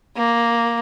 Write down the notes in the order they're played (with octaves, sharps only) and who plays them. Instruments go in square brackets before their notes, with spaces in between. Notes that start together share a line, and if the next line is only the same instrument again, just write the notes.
[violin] A#3